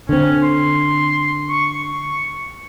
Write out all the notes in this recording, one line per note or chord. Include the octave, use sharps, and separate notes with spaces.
D3 C4 C#4
C6
C#6